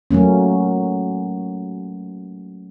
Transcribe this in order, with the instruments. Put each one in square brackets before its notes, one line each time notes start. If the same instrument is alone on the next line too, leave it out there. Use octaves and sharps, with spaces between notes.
[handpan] F#3 A3 A#3 C#4